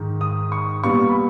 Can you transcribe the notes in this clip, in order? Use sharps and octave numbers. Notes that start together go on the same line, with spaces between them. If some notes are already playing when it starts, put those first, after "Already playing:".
Already playing: G#2 D#3
D#6
C#6
A#2 G3 B3 C#6
B5